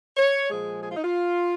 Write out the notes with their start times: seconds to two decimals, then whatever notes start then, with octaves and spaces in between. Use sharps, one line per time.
0.17 C#5
0.49 A#2 F3 G#3 G#4
0.80 G#4
0.88 F4
0.95 D#4
1.03 F4